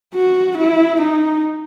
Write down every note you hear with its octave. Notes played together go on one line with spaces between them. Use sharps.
F#4
E4
D#4